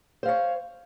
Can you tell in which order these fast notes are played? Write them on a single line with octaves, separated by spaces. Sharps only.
C5 F5 C#5